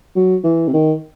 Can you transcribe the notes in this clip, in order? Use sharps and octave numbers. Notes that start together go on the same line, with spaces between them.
F#3
E3
C3
D#3